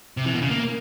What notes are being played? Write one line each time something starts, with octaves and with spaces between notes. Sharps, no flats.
C3
E3
B2
C#3
A#3